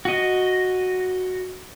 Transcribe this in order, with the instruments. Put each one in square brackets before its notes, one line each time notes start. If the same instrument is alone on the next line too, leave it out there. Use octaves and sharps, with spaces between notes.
[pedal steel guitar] F#4 D#5